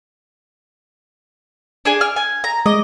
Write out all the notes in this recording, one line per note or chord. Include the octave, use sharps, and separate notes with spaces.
D4 G#4 G#5
F6
G#5
A#5
G#3 D#5 D6